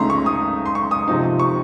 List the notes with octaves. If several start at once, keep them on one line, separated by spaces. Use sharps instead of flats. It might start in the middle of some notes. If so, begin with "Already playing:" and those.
Already playing: C#2 C#3 A3 D#4 A#5 C6
C#6
D#6
C6
C#6
D#6
C3 F3 C4 D#4
C#6